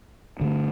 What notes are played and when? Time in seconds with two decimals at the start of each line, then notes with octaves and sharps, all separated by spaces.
0.40 G2 D3 A3